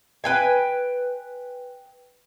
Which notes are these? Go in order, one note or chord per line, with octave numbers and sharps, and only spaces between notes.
B4 G5 G#5